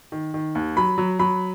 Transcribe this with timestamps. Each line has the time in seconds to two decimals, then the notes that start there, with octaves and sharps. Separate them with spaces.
0.12 D#3
0.34 D#3
0.55 D#2
0.77 F#3 B5
0.98 F#3
1.19 F#3 B5